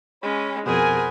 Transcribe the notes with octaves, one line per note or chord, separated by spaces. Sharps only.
G#3 C#4 C#5 B5
F2 B2 G#4 A#4 C5 F#5 G#5 B5